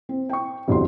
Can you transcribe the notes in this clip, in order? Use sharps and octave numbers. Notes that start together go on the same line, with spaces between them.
C4
G5 C#6
G1 C2 F2 F#4 C6